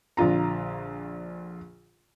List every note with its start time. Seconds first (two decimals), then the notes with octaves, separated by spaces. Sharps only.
0.17 A#1 D3 F4 A#5